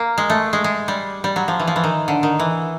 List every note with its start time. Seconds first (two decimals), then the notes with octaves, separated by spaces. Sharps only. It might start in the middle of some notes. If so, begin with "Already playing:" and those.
Already playing: A#3
0.18 G#3
0.30 A3
0.53 G#3
0.64 G#3
0.88 G3
1.24 G3
1.36 F#3
1.48 F3
1.60 E3
1.67 F3
1.76 E3
1.84 D#3
2.08 D3
2.23 D#3
2.40 E3